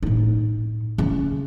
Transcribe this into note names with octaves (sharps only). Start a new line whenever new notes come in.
A2 D#4
C#3